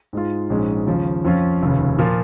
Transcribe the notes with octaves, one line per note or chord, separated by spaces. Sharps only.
G#2 G#3 F4
A#1 G#2 G#3 C#4
D#2 C#3 F3
F2 F3 C#4 F4
F1 D#2 C#3
A#2 F3 A#3 F4